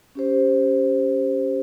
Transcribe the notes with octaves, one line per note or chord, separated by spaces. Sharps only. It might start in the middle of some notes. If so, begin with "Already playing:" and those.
C#4 G4 C5